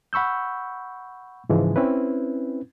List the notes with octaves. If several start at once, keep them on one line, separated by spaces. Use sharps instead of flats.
F#5 B5 C#6 E6 G6
G#2 C#3 E3 F3 G#3
C4 C#4 E4 B4